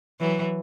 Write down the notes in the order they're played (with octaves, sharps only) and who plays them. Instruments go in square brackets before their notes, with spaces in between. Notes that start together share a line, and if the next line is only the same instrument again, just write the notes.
[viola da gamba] E3 F#3